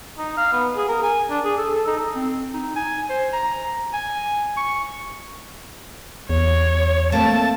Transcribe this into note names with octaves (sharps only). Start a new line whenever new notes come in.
D#4
F5
B3
G#4
A#4
G#5
D4
G#4
A4
A4
D#4
C4
D#4
G#5
C5
A#5
G#5
C#6
E2 C#5
A3 A#3 C4 A5